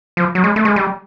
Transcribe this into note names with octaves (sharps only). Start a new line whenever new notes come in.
F3
F#3
G#3
A3
G#3
G3